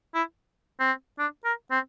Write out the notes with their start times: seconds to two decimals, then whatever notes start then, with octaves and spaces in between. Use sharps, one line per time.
0.15 E4
0.80 C4
1.19 D4
1.44 A#4
1.71 C4